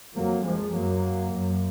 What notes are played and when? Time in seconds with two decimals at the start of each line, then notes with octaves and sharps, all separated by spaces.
0.15 F2 F#3 A#3
0.45 F3 G#3
0.75 F#2 F#3 A#3
1.33 F#2